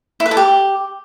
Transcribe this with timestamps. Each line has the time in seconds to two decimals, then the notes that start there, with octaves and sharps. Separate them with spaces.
0.20 E4
0.26 B4
0.31 A4
0.37 G4